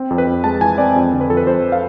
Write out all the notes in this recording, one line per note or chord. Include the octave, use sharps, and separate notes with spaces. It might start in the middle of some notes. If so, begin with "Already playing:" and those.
Already playing: C4
F2
B4
F2
G#3 A5
E3 G#5
C4 D5
F2
D3
B4
F2 A4
B4
F2 C5
F5